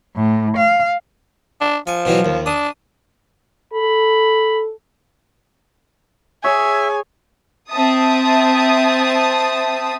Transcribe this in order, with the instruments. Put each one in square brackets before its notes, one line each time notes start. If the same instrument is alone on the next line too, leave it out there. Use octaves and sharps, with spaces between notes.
[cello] A2
F5
[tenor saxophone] D4
[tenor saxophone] F3 [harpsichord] G#5
[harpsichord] B2 E3 F#3
D#2
[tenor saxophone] D4 [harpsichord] D#6
[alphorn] A4 [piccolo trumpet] B5
[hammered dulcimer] G#4 C#5 [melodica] E5 [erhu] G#5
[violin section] C4 E5 A5 D#6